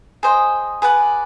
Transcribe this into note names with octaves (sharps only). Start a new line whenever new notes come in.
G#4 C5 D#5 G5
G#4 B4 D5 F#5